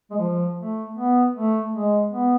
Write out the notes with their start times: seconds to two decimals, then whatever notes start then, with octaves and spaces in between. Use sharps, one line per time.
0.11 G#3
0.18 F3
0.57 A3
0.95 B3
1.33 A3
1.72 G#3
2.10 B3